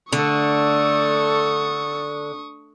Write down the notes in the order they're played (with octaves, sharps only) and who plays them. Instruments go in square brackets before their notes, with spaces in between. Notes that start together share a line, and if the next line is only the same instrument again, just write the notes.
[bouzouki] D3 [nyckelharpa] A3 A4 [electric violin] C#6 D#6